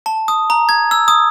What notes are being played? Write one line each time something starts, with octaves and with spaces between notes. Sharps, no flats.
A5
D#6
A#5
G#6
E6
D#6